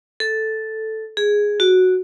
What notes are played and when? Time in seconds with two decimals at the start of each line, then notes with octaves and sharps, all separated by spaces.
0.20 A4
1.17 G#4
1.60 F#4